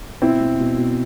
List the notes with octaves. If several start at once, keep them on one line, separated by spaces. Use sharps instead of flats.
B2 C4 E4
B2
B2
B2